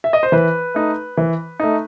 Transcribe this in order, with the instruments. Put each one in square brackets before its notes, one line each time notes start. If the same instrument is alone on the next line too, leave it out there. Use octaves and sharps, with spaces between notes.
[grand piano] E5
D#5
C5
E3 B4
A3 D#4
E3
A3 D#4